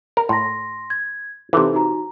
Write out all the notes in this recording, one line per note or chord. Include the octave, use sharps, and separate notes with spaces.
A#4
A2 C6 A#6
G#6
C3 E3 D#4 A4
D#4 F#4 A#5